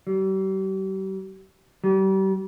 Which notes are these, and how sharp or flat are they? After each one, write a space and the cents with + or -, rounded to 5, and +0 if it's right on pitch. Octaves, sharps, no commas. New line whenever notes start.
G3 -40
G3 -35